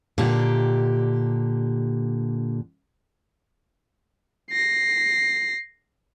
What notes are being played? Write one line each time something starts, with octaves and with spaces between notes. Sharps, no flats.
A#2 D3 G4
A#6 C7